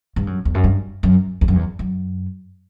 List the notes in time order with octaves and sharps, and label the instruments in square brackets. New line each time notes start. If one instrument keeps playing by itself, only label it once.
[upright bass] G2
F#2
E2
F#2
G2
F#2
E2
F#2
E2
F#2